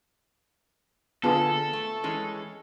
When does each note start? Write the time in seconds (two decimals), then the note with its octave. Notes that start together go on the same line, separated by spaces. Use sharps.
1.23 A#2 D3 B3 F4 G#4 A4 A5
1.73 A3
2.04 E3 G#3 C#4